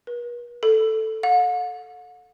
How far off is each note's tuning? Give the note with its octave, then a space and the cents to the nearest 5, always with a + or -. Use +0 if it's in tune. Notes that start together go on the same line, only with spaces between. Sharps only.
B4 -45
A4 +0
F#5 -45